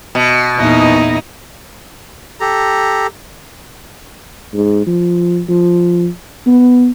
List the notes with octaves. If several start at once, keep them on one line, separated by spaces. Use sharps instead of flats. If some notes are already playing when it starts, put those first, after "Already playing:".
B2
E2 A#2 D#4 E4 D#5
G4 A4 A#5
G#2
F3
F3
B3